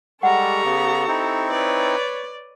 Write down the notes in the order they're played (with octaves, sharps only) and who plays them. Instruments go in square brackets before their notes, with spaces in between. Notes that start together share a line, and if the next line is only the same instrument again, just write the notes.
[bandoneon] G3 G#3 [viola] G4 A#5 [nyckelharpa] A4 C#6 [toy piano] F#5
[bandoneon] C#3 B3
C4 D#4 E4
[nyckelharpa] B4 C#5 [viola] D5